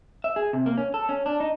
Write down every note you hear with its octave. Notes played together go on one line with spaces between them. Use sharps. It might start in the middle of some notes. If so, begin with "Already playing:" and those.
E5
G#4
C3
A#3
C#4
A4
C#4
D4
D#4